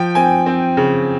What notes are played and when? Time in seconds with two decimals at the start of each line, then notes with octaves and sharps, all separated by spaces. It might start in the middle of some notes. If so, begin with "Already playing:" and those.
Already playing: F3 G5
0.15 C4 G#5
0.46 C4
0.77 C#3